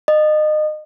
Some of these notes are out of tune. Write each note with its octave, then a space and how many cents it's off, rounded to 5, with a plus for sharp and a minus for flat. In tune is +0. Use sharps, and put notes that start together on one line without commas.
D#5 -30